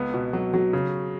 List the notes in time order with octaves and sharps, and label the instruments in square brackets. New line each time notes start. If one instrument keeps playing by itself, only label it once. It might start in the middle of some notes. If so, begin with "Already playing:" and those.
Already playing: [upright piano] C#2 B3
B2
F#3
F#3
C#3